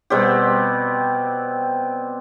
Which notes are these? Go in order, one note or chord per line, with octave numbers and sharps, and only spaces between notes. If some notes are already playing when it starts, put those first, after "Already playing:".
B2 G3 C4 G4